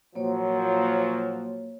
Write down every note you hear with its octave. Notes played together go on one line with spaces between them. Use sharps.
A#2 F3 F#3 A#3 C#5